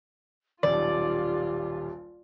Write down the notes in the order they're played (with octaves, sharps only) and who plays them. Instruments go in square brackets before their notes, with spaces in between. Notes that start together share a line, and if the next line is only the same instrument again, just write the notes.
[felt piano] D#1 B1 [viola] F4 [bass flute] G4 [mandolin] D5